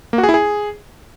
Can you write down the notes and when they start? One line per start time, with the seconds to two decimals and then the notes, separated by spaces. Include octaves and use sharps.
0.13 A#3
0.18 F#4
0.23 G#4
0.29 E4
0.34 G#4